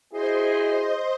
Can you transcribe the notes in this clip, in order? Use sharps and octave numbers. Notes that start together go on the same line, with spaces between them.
E4 F#4 G#4 C5 D#5 C6